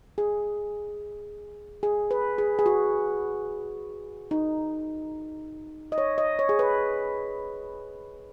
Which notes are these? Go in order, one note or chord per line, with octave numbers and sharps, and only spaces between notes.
G#4
G#4
B4
G#4
G#4
F#4
D#4
D#5
C#5
D#5
C#5
G#4
B4